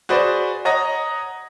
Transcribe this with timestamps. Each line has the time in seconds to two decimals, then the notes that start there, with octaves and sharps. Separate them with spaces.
0.09 F#4 G#4 B4 C5 D5
0.65 C#5 D#5 F#5 A#5 D#6 A#6